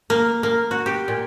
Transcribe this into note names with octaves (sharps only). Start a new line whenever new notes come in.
A#3
A#3
F#4
G4
A#2